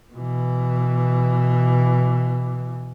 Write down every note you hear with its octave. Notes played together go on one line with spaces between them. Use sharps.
B2 E3